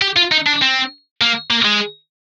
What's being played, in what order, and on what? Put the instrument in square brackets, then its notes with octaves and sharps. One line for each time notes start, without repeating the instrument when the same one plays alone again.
[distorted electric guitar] G4
F4
D#4
D4
C4
A#3
A#3
G#3